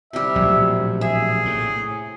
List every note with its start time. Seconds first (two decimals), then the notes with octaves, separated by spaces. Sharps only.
0.13 C3 G3 E5
0.35 A#1 A2 F#3
1.01 G#4 E5
1.45 A2